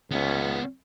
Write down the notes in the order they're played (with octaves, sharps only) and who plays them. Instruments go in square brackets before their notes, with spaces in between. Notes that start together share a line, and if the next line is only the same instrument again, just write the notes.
[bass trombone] C#2 [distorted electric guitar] B3 C#4